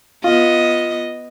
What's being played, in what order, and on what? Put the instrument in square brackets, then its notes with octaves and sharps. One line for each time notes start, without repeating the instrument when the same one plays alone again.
[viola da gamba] B3 D#5 [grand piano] F4